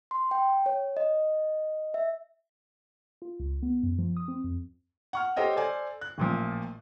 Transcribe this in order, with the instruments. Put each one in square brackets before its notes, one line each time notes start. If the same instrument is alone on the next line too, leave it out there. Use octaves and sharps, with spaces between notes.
[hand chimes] C6
G5
C#5
D#5
E5
[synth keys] F4
C#2
B3
F#2
F3
D#6
C4
F2
[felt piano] F#5 C#6 F6
G4 A4 C5 C#5 D#5 G5
A4 C5 D5 G#5
F#6
A1 A#2 F3